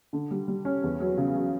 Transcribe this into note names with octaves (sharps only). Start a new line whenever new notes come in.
D3
G3
G3
C#4
E2
F#3
C#3
F#3